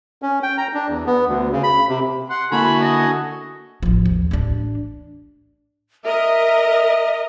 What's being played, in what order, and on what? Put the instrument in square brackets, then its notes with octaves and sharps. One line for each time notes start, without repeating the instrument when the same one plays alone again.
[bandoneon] C#4
G5
A#5
D4
E2
B3
D2
C#3
B5
C3
[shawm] F#5 [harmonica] C6
[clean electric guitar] D3 A#3 E4 [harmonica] F#4 A4 G#5 [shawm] B5
[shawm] D#5
[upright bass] A1 F3
D#2
A1 D4
[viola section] A#4 D#5 [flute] E5